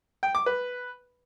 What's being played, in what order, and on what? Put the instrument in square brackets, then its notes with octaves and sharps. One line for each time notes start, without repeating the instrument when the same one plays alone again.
[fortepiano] G5
D6
B4